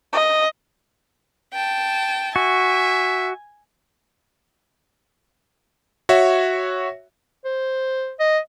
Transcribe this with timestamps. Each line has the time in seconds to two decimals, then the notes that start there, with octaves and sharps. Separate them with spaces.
0.13 D#5
1.54 G5 A5
2.36 F#4 E5 G#5
6.09 F#4 C#5 E5
7.45 C5
8.20 D#5